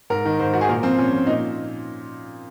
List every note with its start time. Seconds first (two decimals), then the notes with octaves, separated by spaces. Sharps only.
0.10 G#2 A#4
0.25 D#3
0.39 G#2 C5
0.53 D#3 F#4
0.61 G#4
0.68 A#2 A#4
0.83 F3 C4
0.98 A#2 C#4
1.12 F3
1.27 A#2 D#4